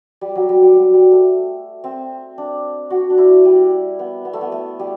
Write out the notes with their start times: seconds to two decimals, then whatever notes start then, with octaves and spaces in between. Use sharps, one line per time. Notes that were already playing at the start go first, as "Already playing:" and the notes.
0.21 G3
0.35 F#3
0.49 G3
0.63 G3
0.76 F#3
0.94 G3
1.12 A3
1.84 C4
2.38 D4
2.90 F#4
3.10 D4
3.18 E4
3.45 G3
3.99 B3
4.25 B3
4.33 A3
4.41 B3
4.52 A3
4.79 G3